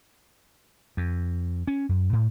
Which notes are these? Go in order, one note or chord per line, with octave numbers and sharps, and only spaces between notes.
F2
C#4
F#2
A2